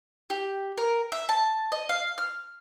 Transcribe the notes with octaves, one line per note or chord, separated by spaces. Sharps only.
G4
A#4
E5
A5
D#5
F5
F6